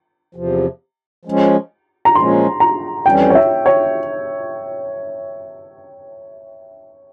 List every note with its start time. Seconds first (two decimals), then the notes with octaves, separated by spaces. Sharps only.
0.35 E2 C3 F3
1.25 F3 G#3 C#4
2.05 A#5
2.15 A#2 F3 G#3 C#4 C6
2.60 A#5
3.06 F2 E3 G3 C#4 G5
3.30 C#5
3.35 E5
3.66 C#5